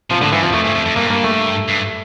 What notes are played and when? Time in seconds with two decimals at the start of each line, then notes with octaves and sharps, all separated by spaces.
0.10 C3 F3
0.21 A2 D3
0.32 G2 E3
0.42 F2 F3
0.53 F2 A3
0.64 G2
0.75 F2
0.86 F2
0.96 G2 A#3
1.10 A#3
1.24 A3
1.69 G2